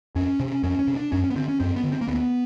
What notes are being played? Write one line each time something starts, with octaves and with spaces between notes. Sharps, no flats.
F2 C#4
C3
F2 C#4
C#4
C3
D4
F#2 C#4
C#4
B3
D3 C4
C#4
F#2 C4
B3
D3
C4
A#3
D2 B3